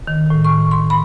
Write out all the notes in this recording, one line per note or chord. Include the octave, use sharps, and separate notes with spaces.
D#3
A2
C#6
C6
B5